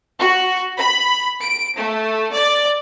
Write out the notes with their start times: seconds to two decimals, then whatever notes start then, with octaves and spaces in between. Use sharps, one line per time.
0.19 F#4
0.78 B5
1.41 D7
1.76 A3
2.32 D5